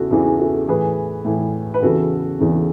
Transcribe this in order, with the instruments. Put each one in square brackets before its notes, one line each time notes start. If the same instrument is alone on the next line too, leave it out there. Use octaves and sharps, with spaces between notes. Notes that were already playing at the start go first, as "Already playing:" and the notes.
Already playing: [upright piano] E2 C#3 E3 E4 F#4 G#4 A4
E2 C#3 E3 E4 G#4
F#4 A4
A2 E3 G#4 B4
A2 E3
B4
E2 C#3 E3 F#4 A4
E2 C#3 E3